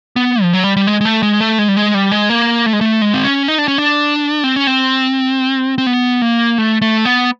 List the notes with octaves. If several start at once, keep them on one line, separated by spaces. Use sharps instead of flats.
B3
F3
F#3
G3
G3
G#3
G#3
A3
G#3
A3
G#3
G3
G#3
G3
G#3
A#3
A3
G#3
A3
G#3
C4
C#4
D#4
D4
C#4
D4
C4
C#4
C4
C4
B3
A#3
A3
A3
B3